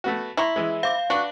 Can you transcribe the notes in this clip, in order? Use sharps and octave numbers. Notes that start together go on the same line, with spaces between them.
A3 B3 F#4
E4 A#5 C6 C#6
E3 G#3
C5 F5 D6
D4 F#4 B4